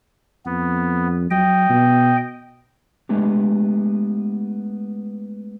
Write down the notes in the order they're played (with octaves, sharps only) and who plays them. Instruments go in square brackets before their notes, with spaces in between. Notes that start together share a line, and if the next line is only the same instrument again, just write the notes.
[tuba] F2 [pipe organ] B3
[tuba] F#3 [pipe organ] D#5 G5
[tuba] B2
[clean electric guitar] G#3 A3 B3 D4 G4